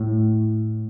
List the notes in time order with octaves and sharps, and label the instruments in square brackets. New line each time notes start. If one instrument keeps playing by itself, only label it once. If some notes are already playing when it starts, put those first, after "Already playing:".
Already playing: [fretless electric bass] A2